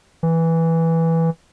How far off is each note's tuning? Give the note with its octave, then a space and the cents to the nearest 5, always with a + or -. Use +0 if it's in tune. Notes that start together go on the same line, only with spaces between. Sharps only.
E3 -5